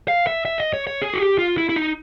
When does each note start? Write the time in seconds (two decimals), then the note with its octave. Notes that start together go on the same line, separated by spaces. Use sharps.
0.08 F5
0.27 E5
0.45 E5
0.59 D#5
0.73 C#5
0.87 C#5
1.02 G#4
1.14 F#4
1.20 G4
1.39 F4
1.58 E4
1.69 E4
1.76 D#4